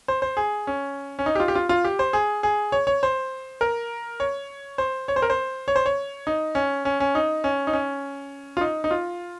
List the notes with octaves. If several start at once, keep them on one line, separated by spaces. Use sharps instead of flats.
C5
C5
G#4
C#4
C#4
D#4
G4
F4
G4
F4
F4
G4
C5
G#4
G#4
C#5
C#5
C5
A#4
C#5
C5
C#5
C5
A#4
C5
C#5
C5
C#5
D#4
C#4
C#4
C#4
D#4
C#4
D#4
C#4
F4
D#4
D#4
F4